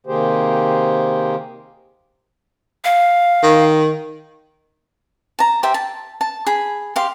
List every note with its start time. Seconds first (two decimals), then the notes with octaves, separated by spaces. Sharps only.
0.06 C3 D#3 A#3 G4 G#4 C5
2.84 F5
3.43 D#3
5.39 A5 A#5
5.63 G4 C5 E5 G5
5.74 A5
6.21 A5
6.47 G#4 B5
6.96 G4 F5 C6